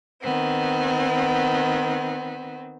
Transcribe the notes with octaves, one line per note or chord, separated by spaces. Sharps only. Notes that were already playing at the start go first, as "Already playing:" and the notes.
D#3 B3 C4